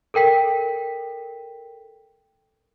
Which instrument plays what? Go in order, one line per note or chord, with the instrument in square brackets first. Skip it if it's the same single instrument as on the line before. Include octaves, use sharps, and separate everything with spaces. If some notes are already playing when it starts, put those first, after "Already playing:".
[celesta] A4 A#4 G5 B6